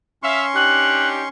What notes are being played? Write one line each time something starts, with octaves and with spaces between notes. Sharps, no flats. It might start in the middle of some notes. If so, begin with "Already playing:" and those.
C#4 E5 F5 C6 C#6
D4 D#4 G4 F#6